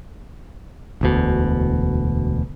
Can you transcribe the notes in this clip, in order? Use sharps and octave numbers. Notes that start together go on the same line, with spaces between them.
E1 D2 B2